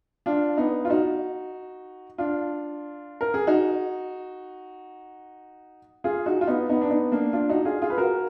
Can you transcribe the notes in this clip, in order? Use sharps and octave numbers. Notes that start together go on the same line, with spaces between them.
D4 F4
B3 D#4
F4
D#4 F#4
D4 F4
A#4
G#4
D#4 F#4
F4 G#4
D#4 F#4
F4
B3 D#4
B3 D#4
D4
B3 D#4
A#3 D4
D4 F4
D#4 F#4
F4 G#4
F4 G#4
B4
F#4 A#4